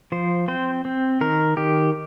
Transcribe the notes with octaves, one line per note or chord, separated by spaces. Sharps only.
F3 C5
C4 C5
C4
D#3 A#4
D#3 G4